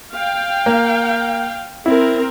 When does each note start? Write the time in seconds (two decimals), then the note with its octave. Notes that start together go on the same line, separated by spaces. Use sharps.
0.12 F5 G5
0.66 A#3
1.86 C4 E4 A#4